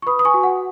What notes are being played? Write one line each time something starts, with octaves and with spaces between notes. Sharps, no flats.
C#6
B4 B5 D#6
D#6
G#5 C#6
F#4
F#5